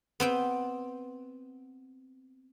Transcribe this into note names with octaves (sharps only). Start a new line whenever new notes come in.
B3 C4 G5